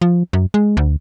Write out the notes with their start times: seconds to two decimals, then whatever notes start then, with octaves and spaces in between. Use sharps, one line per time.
0.02 F3
0.33 F#2
0.54 G#3
0.77 D2